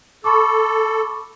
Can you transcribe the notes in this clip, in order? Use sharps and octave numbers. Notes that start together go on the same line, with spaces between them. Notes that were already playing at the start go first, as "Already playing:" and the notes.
A4 B5 C#6 D6